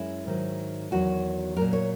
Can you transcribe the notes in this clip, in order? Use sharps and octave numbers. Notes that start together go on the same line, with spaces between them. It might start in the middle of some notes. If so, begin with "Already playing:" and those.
Already playing: F#2 G#3 E4
G#2 D#3 F#3
E2 D#3 F#3 F#4
A#2 F#3 A#4
C#5